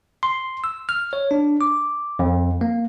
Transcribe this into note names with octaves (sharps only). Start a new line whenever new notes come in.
C6
E6
F6
C#5
D4
D6
F2
A#3